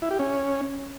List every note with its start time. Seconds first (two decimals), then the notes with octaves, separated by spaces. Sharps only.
0.02 E4
0.11 G4
0.19 C#4